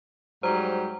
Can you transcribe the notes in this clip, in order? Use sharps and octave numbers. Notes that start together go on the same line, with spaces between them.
G#2 F#3 G3 C5 A#5